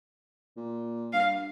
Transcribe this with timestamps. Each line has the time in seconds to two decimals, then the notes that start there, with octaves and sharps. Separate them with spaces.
0.57 A#2
1.13 G2 F5